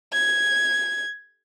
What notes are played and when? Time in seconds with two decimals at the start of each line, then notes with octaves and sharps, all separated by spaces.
0.13 G#6